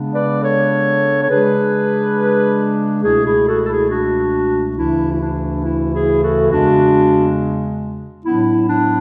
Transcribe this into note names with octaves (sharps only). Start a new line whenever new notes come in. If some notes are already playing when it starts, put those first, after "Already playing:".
Already playing: C#3 G#3 B3 D4
B4 D5
A4 C#5
C#5
C#3 G#3 D4 G#4 B4
C#2 B2 A3 E4 G#4
E4 G#4
F#4 A4
A4
E4 G#4
D4 F#4
D2 C#3 E3 A3 D4 E4
E4
D4
E4
E4 G#4
F#4 A4
E2 C#3 G#3 D4 F#4
A2 F#3 B3 D4 E4
D4